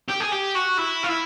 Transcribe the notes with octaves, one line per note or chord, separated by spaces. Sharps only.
G4
G#4
G4
F#4
E4
F4
E4